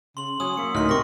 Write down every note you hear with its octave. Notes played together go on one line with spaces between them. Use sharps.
C#3 C6 F#7
F#3 C#4 C#5 D#6
F#3 A#3 E5 C#7
D2 A2 D#3 C#4 D#4 A#4 C6 F6
C3 C#6 A#6